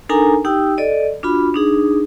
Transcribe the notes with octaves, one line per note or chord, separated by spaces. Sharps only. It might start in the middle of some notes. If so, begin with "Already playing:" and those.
D4 D#4 A4 A#4 G#5 A#5
D#4 G4 G5 E6
A4 D5 D#5
D4 F4 F#4 B5
D4 D#4 G#4